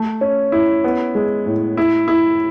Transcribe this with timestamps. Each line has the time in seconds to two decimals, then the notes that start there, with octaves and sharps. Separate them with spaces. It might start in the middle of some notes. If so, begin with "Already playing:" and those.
Already playing: A3
0.21 C#4
0.52 E4
0.84 B3
1.15 G#3
1.46 A2
1.77 E4
2.08 E4